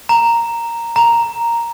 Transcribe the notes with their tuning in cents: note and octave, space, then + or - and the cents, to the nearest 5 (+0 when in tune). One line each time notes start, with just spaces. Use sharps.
A#5 -5
A#5 +0